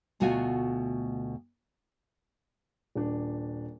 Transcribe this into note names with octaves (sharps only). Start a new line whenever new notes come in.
D2 B2 A3 F4 F#4 G#5
D#1 D4